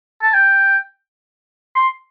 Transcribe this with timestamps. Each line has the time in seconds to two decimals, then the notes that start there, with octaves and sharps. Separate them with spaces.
0.23 A5
0.34 G5
1.76 C6